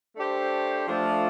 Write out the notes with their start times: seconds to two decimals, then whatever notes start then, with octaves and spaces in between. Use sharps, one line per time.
0.16 A3 D4 G4 C5
0.87 F3 A3 D4 F4 A4